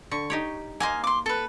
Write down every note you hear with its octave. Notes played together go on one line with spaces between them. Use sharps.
D3 C#6
D#4 G4 C#5
A#3 C5 D#5 F5 G#5
C6 D6
A4 B4